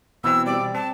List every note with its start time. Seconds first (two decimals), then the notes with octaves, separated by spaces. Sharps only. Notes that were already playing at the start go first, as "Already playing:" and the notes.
0.24 B2 E3 C4 E6
0.46 G3 D5
0.75 C4 A5